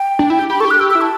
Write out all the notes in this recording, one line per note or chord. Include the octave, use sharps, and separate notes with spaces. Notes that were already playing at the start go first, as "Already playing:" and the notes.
Already playing: G5
D4
E4
G4
G4 B5
A4 C#6
G4
F#6
G4 E6
E6
E4
A5